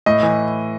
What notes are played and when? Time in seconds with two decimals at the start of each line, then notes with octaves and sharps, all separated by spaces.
0.06 A2 D#5
0.23 E3